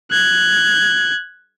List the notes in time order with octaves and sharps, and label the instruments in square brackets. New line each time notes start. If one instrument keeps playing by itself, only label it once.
[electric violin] F#6 G#6